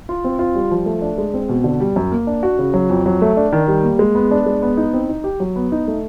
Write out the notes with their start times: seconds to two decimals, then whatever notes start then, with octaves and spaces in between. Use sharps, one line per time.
0.09 F4
0.24 C4
0.39 F4
0.55 G3
0.71 F3
0.86 A3
1.02 D4
1.18 G#3
1.34 C4
1.49 B2
1.64 D3
1.80 G3
1.96 F#2
2.12 A#3
2.27 D4
2.43 F#4
2.59 C#3
2.74 F#3
2.90 F2
3.06 F#3
3.22 A3
3.37 D4
3.52 D#3
3.68 G3
3.83 A#3
3.99 G#3
4.15 B3
4.31 D4
4.46 G#3
4.62 B3
4.77 D#4
4.93 C4
5.09 D#4
5.24 G4
5.40 F#3
5.56 B3
5.72 D#4
5.88 A3